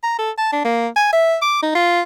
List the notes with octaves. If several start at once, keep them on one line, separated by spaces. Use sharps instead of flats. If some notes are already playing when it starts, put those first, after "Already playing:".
A#5
A4
A5
D4
A#3
G#5
E5
D6
D#4
F4